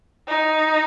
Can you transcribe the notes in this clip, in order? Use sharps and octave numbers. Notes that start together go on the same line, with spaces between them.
D#4